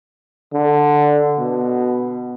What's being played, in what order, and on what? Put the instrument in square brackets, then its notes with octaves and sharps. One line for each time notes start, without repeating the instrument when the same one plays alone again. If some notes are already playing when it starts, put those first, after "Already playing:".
[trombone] D3
B2